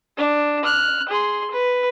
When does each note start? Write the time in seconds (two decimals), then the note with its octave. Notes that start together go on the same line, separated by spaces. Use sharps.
0.17 D4
0.65 F6 F#6
1.09 G#4 C6
1.51 B4